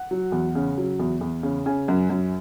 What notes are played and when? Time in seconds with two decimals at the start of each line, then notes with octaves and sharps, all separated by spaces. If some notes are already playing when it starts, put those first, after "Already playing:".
Already playing: F#5
0.11 F#3
0.32 E2
0.55 C#3
0.78 F#3
0.99 E2
1.21 E2
1.43 C#3
1.66 C#3 G#5
1.88 F#2
2.10 F#2